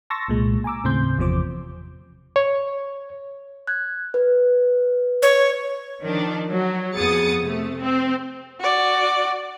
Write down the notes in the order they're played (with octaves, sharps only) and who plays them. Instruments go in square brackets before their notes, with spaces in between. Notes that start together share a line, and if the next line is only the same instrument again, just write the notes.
[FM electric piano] A5 C6 C#6 E6 A6 A#6
C2 A#2 G#3
G#5 A#5 D6 E6
D#2 A2 C#3 C4 C6 G6
G1 E2 C3 F3 C5 D6
[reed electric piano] C#5
[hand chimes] F#6 G#6
B4
[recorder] C#5
[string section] D#3 F3 D4
F#3 F#4
F2 B3 G#4 D#6 A6 C#7
C3 A3
C4
[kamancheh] F#4 D5